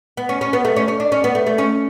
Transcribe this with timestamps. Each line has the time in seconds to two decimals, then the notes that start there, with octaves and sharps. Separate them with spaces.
0.17 B3
0.29 C#4
0.41 C#4
0.53 B3
0.65 A3
0.76 C#4
0.88 C#4
1.00 D4
1.12 C#4
1.24 B3
1.35 A3
1.46 A3
1.58 C#4